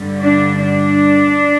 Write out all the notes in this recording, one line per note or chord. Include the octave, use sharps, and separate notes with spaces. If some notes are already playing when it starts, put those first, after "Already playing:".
Already playing: G2 D3 G3
D4
D4